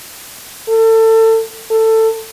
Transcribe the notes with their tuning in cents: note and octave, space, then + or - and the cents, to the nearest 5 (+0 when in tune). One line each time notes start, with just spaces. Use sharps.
A4 +30
A4 +15